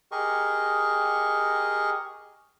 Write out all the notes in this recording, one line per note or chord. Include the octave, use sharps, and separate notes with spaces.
G4 G#4 A#4 D#5 C#6